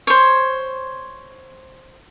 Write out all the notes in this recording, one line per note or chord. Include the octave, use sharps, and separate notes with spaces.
C5 C#5